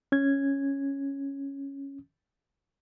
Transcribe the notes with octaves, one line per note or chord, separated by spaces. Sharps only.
C#4 G#6